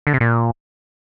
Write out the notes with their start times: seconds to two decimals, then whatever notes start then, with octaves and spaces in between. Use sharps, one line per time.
0.07 D3
0.14 C3
0.21 A#2